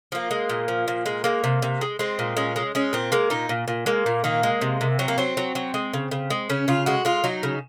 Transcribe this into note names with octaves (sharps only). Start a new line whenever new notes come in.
F3 A#3
G#3
A#2
F3
A#2
G#3
G#3 A#3
C3
C3
G#3
G#3 C4
A#2
G#3 C#4
G#3
G#3 C#4
A#2 C4
G#3 A#3
A#2 D#4
A#2
A#2
G#3 A#3
A#2
D#3 A#3
G#3
C3
C3
F#3 C4
A#3
F#3 C4
F#3
F#3
G#3
C#3
C#3
G#3
C#3 C#4
C#3 F4
G#3 F#4
G#3 F4
F#3 D#4
C#3